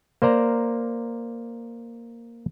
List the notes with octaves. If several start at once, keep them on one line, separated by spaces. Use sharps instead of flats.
A#3 C5 D5 A#5